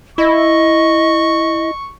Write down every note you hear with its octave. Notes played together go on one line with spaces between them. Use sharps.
E4 D#5 C#6